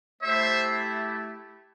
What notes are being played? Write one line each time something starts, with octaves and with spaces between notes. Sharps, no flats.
A3 E4 G4 C5 E5